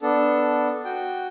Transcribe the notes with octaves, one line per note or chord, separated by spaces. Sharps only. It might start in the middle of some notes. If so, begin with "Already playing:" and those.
B3 D4 A4
F#4 G5